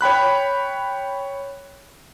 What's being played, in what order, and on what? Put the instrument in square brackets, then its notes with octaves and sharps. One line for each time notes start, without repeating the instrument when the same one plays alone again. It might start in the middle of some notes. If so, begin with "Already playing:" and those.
[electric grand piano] C#5 G5 B5 F#6